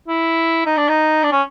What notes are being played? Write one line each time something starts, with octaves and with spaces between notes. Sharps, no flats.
E4
D#4
D4
D#4
D4
C#4